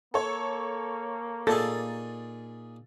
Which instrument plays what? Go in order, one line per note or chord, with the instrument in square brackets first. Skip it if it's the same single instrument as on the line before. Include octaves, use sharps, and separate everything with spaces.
[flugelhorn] A#3 [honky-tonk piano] A4 C#5
[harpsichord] A#2 D#4 G#4 [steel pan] A4 [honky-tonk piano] A6